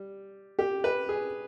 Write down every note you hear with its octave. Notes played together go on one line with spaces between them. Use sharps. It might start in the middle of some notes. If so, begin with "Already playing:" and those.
Already playing: G3
G4
B4
G#4